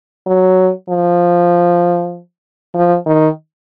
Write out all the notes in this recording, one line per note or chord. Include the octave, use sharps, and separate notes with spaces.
F#3
F3
F3
D#3